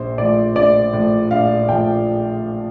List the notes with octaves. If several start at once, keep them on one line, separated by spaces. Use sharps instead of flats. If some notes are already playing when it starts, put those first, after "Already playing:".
Already playing: A#1 C5
A2 F3 D5
A#1 D5
A2 F3
A#1 F5
A2 F3 G5